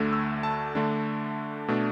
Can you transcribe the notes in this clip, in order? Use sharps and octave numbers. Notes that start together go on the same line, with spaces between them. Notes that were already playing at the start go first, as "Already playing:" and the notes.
Already playing: D2 D3 A3 E6
E6
A5
D3 A3 D4
B2 A3 D4